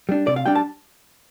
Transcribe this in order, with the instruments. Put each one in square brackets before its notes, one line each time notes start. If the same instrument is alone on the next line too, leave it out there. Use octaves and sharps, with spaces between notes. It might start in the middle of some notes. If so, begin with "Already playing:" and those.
[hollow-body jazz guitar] G3 D4
C3 D5
F5
G3 D4 G5
A5